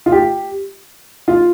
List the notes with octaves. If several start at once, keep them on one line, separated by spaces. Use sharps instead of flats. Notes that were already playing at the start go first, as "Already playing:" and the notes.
F4
G4
F4